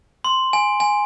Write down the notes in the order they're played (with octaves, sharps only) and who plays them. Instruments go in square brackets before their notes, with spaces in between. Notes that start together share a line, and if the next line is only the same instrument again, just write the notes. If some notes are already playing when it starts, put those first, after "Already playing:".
[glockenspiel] C6
G#5
G#5